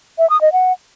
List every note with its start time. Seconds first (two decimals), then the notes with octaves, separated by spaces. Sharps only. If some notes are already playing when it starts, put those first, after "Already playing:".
0.18 E5
0.30 D#6
0.41 D#5
0.53 F#5